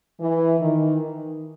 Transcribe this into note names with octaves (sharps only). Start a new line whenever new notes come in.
E3
D#3